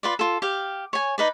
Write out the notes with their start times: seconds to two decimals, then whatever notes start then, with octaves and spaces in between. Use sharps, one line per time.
0.03 F4 B4 D5
0.19 F4 A4
0.42 G4 F5
0.93 C#5 G#5
1.18 D#4 B4 D5